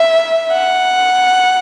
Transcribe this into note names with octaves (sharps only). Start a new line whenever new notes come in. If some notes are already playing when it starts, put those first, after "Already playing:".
Already playing: E5
F#5